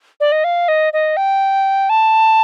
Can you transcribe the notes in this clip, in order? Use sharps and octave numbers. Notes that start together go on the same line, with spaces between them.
D5
D#5
F5
D#5
D#5
G5
A5